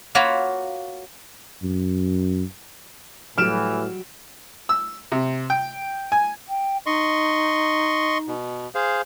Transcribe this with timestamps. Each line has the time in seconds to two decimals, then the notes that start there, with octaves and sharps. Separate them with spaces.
0.15 A#3 F4 F#4 C#5 B5
1.63 F#2
3.38 A2 E3 F#3 G3 G4 F6 D7 E7
4.69 E6
5.12 C3
5.50 G5
6.12 G#5
6.49 G5
6.86 D#4 D#5 C6 C#6
8.28 B2
8.75 G#4 C5 F5